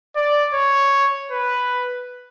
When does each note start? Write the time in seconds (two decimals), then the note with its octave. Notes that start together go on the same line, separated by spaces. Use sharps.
0.16 D5
0.54 C#5
1.32 B4